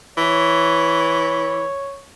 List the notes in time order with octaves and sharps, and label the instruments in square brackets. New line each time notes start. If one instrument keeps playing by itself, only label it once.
[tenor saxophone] E3 [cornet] C#5